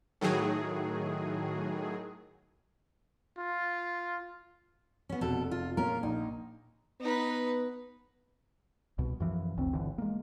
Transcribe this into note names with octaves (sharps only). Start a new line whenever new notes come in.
A2 D#3 F#3 G#4
F4
B3 C#4
F1 B2 A4
F4
A#2 C#4 F4 A#4
A#1 D#4
B3 D#4 B4
C2 B2
F#2 E3 F3
G1 D2 C#3 C4
G1 D3 E3
G#3 A#3